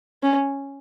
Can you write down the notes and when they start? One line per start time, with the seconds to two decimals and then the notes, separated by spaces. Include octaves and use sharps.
0.23 C#4